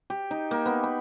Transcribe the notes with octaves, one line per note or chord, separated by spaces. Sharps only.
G4
D#4
A#3
B3
B5